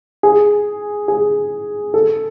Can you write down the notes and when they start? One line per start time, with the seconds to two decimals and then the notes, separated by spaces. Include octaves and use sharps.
0.23 G#4
1.08 G#4
1.94 A4